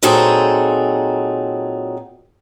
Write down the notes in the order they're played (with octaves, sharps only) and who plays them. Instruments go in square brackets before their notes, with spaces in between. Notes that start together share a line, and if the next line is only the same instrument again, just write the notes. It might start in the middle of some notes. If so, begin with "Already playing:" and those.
[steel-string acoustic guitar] A#2 F#3 C4 D#4 G#4 A4